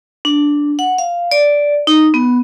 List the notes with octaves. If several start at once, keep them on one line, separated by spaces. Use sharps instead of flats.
D4
F#5
F5
D5
D#4
B3